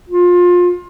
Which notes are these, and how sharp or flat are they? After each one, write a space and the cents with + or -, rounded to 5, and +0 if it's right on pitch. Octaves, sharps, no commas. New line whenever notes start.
F4 +25